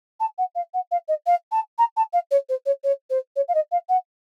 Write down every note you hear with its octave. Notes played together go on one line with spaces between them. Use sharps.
A5
F#5
F5
F#5
F5
D#5
F5
A5
A#5
A5
F5
C#5
C5
C#5
C#5
C5
C#5
F5
D#5
F5
F#5